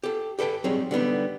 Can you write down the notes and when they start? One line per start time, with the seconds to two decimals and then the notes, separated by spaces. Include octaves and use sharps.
0.03 G4 A4
0.39 G4 A4 B4 G5
0.64 F#3 G3 C4 D#4 G#4 C#5
0.91 D3 G3 B3 D#4